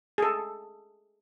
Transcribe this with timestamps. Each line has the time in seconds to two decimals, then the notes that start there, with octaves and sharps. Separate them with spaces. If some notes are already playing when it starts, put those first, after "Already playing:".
0.18 G#4 A4